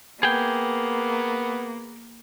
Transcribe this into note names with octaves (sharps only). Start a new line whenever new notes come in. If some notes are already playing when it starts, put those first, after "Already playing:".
A#3 B3 G#4 G5